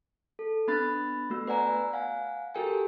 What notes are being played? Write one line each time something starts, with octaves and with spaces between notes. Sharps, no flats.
A4
B3 D4 B5 F#6 A6
A3 B3 F#4 E6
B4 D5 F#5 G#5 A#5
F5 F#5 G#5
F#4 G4 A4 A#4 G5 G#5